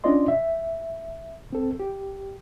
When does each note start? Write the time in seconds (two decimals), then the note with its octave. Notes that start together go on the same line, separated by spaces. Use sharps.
0.04 C#4 D4 F4 D5 D#5 C6
0.28 E5
1.50 C#2 C4 A4
1.80 G4